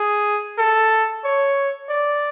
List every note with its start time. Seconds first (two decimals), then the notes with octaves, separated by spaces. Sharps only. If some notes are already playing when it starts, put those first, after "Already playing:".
Already playing: G#4
0.58 A4
1.24 C#5
1.89 D5